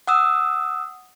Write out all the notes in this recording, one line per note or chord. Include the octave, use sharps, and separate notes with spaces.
F#5 D#6 E6